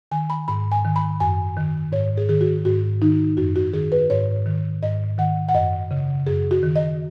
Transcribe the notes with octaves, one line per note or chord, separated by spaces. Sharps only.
D#3 G#5
B5
G#2 B5
G#5
D#3
B5
F#2 G#5
D#3
G#2 C#5
G#4
D#3 G#4
F#4
G#2 F#4
D#3 D#4
F#2 F#4
F#4
D#3 G#4
B4
G#2 C#5
D#3
G#2 D#5
D#3 F#5
F#5
F#2 D#5
C#3
F#2 G#4
F#4
D#3
D#5